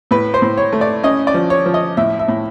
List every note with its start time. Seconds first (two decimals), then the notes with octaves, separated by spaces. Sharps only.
0.11 A2 B4
0.34 C5
0.42 A2
0.58 C#5
0.73 A3
0.81 D5
1.03 C#4 D#5
1.27 D5
1.34 F3
1.50 C#5
1.66 F3
1.74 D#5
1.97 A2 E5
2.19 E5
2.28 A2